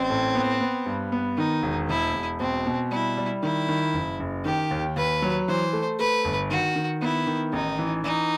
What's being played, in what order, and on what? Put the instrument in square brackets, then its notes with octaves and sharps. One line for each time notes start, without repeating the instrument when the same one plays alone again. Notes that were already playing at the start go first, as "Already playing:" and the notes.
Already playing: [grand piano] A1 [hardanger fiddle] C4
[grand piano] A2
B3
B3
G2
B3
[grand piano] D#3 [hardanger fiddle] D#4
[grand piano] E1
[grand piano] E1 [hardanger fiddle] E4
[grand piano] E1
[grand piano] B2 [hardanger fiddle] C4
[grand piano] B2
[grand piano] G3 [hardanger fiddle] E4
[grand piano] G3
[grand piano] D#3 [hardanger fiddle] E4
[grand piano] D#3
F#1
F#1
[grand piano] D#3 [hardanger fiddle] G4
[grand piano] D#2
[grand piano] D#2 [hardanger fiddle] B4
[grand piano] F#3
[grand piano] E3 [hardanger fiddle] C5
[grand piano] A3
[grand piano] A3 [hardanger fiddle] B4
[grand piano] G1
[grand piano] D#3 [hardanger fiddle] F#4
[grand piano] D#3
[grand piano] B3 [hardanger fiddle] E4
[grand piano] D#3
[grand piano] A1 [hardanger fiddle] D#4
[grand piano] E3
[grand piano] E3 [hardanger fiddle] D#4